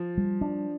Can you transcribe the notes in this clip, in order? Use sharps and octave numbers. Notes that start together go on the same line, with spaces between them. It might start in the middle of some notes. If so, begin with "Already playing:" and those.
Already playing: F3
G3
D4